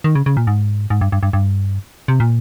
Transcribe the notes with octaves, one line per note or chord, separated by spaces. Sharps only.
D#3
C#3
C#3
A#2
G#2
G#2
G2
G2
G2
G2
C3
A#2